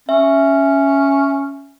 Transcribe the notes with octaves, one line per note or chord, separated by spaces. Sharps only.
C#4 E5